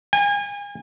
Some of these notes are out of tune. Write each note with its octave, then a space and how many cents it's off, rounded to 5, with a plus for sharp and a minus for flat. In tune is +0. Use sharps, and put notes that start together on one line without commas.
G#5 -35